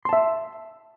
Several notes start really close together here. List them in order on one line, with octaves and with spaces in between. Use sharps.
C6 A5 E5